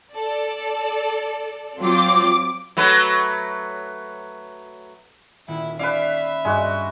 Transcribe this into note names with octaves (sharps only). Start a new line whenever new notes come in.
A4 D5
F#3 C4 F4 D6
F#3 A3 B4
D#1 E4
C#4 B4 D5 E5 F5
G2 G#3 F#4